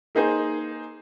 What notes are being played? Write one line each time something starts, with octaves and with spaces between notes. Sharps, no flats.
A#3 D#4 G#4 C5